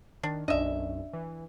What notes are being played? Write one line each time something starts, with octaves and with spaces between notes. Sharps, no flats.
D#3 D4
B1 F#2 D4 D#5 E5
E3